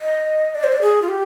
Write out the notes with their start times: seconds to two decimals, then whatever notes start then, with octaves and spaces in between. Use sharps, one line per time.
0.01 D#5
0.55 D5
0.64 C5
0.72 D5
0.82 G#4
1.02 F4
1.09 G4